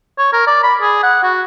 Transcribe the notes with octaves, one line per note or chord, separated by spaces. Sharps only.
C#5
A#4
D5
B5
G#4
F#5
F#4